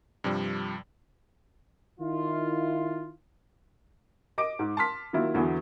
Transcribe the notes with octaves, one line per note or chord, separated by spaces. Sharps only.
G2 C3 F3 G3
D#3 E4 F4
D#5 D6 D7
G#2
A5 C6 F6 B6
D#3 F#3 A#3 E4 F4
E2 D3 E3 F#3 B3